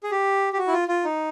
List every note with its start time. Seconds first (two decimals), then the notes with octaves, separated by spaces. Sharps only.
0.03 G#4
0.11 G4
0.53 G4
0.58 F#4
0.67 E4
0.73 F4
0.88 F4
1.04 D#4